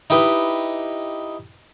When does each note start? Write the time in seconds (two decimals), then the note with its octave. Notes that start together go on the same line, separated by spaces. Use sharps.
0.10 D#4 E4 G4 B4 D#5